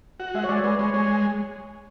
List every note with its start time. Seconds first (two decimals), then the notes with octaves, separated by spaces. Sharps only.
0.20 F#4 F#5
0.34 G#3 E5
0.44 C#5
0.49 G#3 D5
0.64 G#3 B4
0.79 G#3 C#5
0.94 G#3 C#5